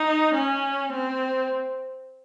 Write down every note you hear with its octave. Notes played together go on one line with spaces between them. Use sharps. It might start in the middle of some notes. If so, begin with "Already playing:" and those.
Already playing: D#4
C#4
C4